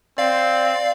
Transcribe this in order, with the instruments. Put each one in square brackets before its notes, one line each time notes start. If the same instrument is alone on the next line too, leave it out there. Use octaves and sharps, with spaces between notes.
[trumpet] C4 [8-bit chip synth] D5 F5